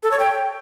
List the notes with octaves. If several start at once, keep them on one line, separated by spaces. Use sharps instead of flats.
A4
C#5
G5